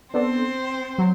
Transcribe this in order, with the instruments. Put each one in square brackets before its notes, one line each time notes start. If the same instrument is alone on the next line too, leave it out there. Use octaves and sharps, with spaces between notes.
[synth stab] B3 D4 A4 [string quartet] C4 C5
[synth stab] F#3